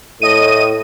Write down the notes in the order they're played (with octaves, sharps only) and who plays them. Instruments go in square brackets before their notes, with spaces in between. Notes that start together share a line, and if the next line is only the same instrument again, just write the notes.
[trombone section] A2 [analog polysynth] D#5 D#7